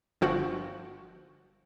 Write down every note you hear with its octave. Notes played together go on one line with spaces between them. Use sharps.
G1 F3 F#4